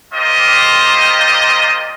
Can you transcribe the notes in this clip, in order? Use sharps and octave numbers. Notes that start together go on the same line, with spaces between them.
G3 A#3 F4 G4 C5 D#5